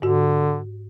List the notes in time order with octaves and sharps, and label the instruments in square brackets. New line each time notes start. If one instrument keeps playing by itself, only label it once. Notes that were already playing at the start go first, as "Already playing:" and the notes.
[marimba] G#2 F#4 [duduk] D3